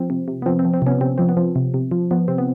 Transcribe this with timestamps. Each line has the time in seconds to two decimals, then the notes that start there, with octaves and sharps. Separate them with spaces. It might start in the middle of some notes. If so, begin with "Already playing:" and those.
Already playing: F3 C4
0.10 C3
0.28 C3
0.42 B3
0.46 F3 C4
0.59 C4
0.65 F3
0.74 C4
0.82 C3 B3 C#4
1.01 C3 C4
1.18 F3 C4
1.29 B3
1.37 F3
1.56 C3
1.74 C3
1.91 F3
2.11 F3 B3
2.28 C3 C4
2.38 B3